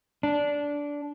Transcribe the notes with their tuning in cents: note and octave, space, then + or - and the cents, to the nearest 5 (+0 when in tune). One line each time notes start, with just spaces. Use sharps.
D4 -15